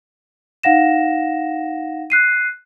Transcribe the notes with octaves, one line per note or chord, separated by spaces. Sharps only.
D#4 F5 F#5 A#6 E7
F#6 C7 D#7